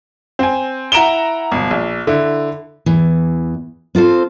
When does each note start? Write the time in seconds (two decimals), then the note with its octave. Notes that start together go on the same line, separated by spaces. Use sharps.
0.39 C4 G#5
0.92 E4 F#5 A#5 D7 E7 G7
1.52 G1 B2
1.71 A#1
2.07 D3 E4
2.86 E2 E3
3.95 C4 F4 A4 C5